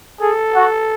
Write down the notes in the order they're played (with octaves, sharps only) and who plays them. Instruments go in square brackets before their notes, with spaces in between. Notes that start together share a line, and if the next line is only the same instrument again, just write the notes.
[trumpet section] G#4 [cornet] A4
[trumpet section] F#4